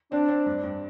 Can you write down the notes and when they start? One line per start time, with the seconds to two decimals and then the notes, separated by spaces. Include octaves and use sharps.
0.12 C4 D4
0.28 C4
0.46 G2
0.63 G2